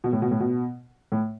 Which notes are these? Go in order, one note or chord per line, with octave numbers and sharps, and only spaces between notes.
B2
A2
B2
A2
B2
A2